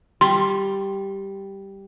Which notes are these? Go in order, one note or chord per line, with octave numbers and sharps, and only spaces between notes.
G3 C6